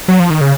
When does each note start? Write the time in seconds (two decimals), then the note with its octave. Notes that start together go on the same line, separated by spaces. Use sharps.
0.08 F#3
0.20 F3
0.30 D#3
0.41 C#3